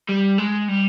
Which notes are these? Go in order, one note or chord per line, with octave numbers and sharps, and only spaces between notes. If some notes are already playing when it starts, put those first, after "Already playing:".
G3
G#3
G3